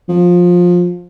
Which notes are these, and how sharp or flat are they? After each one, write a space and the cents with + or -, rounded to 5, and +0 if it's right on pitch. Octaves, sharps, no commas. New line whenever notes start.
F3 +20